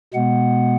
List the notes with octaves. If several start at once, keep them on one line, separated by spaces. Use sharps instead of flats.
B2 G#3 B3 F#5